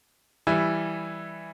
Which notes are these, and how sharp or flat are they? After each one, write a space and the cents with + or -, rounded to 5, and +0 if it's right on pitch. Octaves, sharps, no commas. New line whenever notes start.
E3 +0 G3 +0 E4 +0